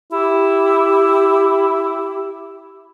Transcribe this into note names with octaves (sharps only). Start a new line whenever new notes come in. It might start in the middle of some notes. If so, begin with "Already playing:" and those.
E4 G4